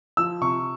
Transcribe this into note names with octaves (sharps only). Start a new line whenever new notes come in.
F3 E6
C3 C#6